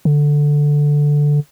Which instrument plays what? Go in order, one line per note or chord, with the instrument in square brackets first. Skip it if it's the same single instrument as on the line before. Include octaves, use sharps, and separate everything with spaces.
[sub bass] D3